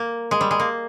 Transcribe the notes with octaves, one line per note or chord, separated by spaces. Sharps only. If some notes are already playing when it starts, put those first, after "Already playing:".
Already playing: A#3
G#3
G3
G#3
A#3